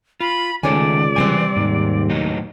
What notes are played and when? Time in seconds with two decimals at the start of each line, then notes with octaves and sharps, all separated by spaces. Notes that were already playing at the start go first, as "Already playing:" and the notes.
0.20 F4 B5
0.63 C#2 D#3 A3 D#4 A4 C#5 D5 G#5
1.16 C3 E3 G3 C4 C5 G#5
1.56 D#2 G#2
2.09 A2 F#3 D#4